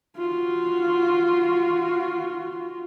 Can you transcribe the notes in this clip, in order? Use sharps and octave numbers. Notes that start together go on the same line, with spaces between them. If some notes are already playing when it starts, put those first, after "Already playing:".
F4 F#4